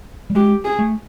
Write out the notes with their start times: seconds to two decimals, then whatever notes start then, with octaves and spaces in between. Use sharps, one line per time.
0.30 G3
0.35 G#3 G4
0.65 G#4
0.79 A3